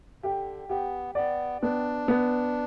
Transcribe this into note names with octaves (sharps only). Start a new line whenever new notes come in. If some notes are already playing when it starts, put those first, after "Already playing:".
D3 G4
B3 G4
B3 D5
B3 D4
B3